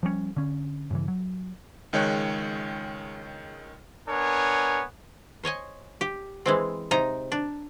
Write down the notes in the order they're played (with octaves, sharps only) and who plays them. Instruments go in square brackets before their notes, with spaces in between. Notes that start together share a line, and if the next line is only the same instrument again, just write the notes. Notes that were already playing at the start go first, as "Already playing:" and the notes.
[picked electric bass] F3 G3 A3 C#4
D3 C#4
G2 C#3 E3
F#3
[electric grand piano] C#2 D#3 G#3 C#5 G5 F#6
[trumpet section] B3 D4 A#4 C#5 G#5
[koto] C5 C#5 D#5 G#5
G4
E3 G#3 C4
C3 D#4 A#5
D4